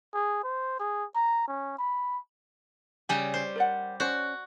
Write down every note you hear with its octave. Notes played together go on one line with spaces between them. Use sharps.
G#4
C5
G#4
A#5
C#4
B5
C#3 G3 G4 G#5
C5
A#4 D5 F#5
C#4 F#4 C5 D5